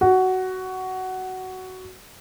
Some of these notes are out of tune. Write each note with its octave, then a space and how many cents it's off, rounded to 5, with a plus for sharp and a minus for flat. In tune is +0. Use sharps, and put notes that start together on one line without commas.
F#4 +15